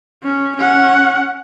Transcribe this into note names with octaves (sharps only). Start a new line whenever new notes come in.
C#4
C#4 F#5